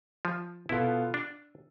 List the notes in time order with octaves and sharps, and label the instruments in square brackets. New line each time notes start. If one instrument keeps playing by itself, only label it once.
[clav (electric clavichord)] F3
[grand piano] B2 B3 F4 A4 [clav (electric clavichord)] E4
[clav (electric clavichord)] D4